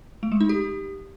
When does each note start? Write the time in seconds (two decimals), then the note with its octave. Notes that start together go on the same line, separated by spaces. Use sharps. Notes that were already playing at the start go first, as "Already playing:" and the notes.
0.23 A3
0.32 G#3
0.40 D#4
0.49 G4